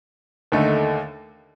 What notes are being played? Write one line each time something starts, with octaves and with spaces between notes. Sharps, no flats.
D#2 D3 A3 D#4